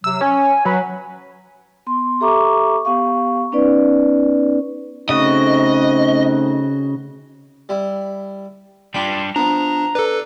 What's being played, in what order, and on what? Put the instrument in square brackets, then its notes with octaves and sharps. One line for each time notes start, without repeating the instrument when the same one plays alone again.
[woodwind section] C3 F#3 [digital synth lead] E6
[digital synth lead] C#4 [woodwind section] G#5
[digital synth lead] F#3 [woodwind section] B4 G#5 B5
[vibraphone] B3 C6
G4 A4 E5 A#5 C#6 D6
B3 G4 F5 C#6
B3 C#4 D#4 B4 D5
[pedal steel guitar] C#3 F#4 [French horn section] A3 C4 D#4 [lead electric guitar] D#5
[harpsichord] G3 E4
[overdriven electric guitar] G3 D4 [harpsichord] F4 G5 B5
[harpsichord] F3 B3 [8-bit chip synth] D4 [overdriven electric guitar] A#5
[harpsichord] D4 [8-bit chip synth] A4 B4